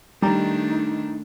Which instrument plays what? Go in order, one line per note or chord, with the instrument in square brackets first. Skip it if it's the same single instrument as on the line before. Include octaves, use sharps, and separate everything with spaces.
[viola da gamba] D#3 A3 D4 [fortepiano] G3 A#5 [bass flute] D#4